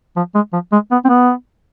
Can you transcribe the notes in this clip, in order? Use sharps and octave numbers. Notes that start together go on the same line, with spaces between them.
F3
G#3
F3
G#3
B3
C4
B3